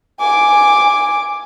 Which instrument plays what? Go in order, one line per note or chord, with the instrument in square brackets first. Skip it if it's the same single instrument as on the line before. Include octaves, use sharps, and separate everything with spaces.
[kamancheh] G#5 D6